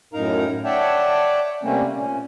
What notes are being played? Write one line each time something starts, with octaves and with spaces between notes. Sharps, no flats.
F#2 A2 D#4 A#4 F5 A#5
C#5 D5 E5 F#5 G5 A5
C3 G3 A3 A#3 C4 C#4
A#2 C#4